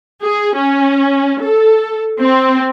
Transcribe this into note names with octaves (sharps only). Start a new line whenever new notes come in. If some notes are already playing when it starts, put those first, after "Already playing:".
G#4
C#4
A4
C4